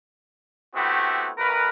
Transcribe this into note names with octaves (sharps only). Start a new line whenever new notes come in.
A3 B3 C4 E4 F#4 G4
A1 A#4 B4